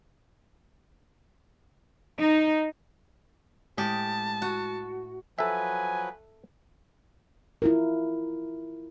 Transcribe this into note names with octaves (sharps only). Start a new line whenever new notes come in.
D#4
A2 G#3 G4 A5
F#4
F3 F#3 A4 B4 E5 G#5
E4 F4 A#4